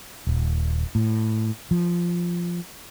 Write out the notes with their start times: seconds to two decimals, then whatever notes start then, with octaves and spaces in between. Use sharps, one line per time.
0.27 D#1
0.95 A2
1.71 F3